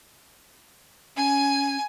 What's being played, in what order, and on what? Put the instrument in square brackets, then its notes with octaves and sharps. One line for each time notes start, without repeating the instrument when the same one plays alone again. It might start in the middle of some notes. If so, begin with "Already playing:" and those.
[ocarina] C#4 [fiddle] G#5